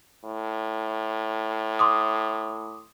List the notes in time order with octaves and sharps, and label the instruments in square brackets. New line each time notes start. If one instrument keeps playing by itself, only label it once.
[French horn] A2
[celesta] C6 D6 D#6